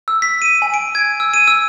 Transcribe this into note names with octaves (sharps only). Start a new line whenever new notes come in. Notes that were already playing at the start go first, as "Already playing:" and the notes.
E6
B6
D#7
G#5
D7
G#6
E6
D#7
E6